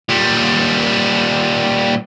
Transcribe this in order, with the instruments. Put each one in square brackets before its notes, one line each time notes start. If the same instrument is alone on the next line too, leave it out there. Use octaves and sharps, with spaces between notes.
[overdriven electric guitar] A#2 G3